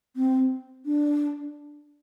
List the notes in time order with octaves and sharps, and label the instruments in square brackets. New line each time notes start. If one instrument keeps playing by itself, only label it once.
[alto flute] C4
D4